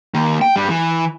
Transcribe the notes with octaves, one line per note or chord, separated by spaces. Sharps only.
D#3 A#3
G5
G2 G3
E3